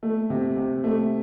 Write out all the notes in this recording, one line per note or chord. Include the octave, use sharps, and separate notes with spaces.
A3
C3
C3
A3